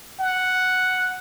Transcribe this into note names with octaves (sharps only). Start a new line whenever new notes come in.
F#5